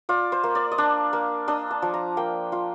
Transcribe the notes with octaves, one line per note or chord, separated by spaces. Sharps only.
F4 D5
C5
A#3
D5
D#5
D4 D5
A#3
D4 D#5
A5
F3
A#5
A#3 G5
F4